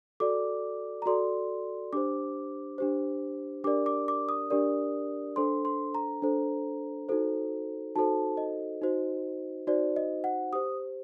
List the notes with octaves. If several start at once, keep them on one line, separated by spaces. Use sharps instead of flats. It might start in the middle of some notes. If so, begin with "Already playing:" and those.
F#4 A4 D5 D6
A#5
F#4 A4 D5 C6
D4 G4 C5 D6
D4 G4 C5
D4 G4 A#4 D5 D6
D6
D6
D#6
D4 G4 A#4 D5
D4 A4 C5 C6
C6
A#5
D4 A4 C5
D#4 F#4 A4 C5
D#4 F#4 A4 C5 A5
D#5
D#4 F#4 C5
D#4 F#4 C5 D5
D#5
F#5
G4 C5 D#6